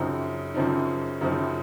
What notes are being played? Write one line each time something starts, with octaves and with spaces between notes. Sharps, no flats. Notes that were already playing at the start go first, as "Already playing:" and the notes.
Already playing: F#2 C#3 F3 C4 D#4
F#2 C#3 F3 C4 D#4
F#2 C#3 F3 C4 D#4